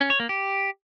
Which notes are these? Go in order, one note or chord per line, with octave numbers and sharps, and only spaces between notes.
C#4
C#5
A#3
G4